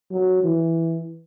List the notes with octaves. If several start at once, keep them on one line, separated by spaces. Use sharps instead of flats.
F#3
E3